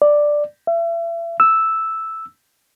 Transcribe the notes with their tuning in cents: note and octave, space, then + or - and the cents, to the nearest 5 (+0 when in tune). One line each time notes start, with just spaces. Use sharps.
D5 +5
E5 +35
E6 -5